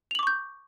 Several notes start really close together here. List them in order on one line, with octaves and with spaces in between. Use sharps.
F7 F#7 D6 C#6 G6